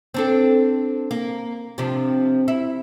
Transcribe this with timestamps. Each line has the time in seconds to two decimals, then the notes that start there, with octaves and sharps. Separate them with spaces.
0.14 C4 D4 A4
1.11 A#3
1.78 C3 F3 D4
2.48 E4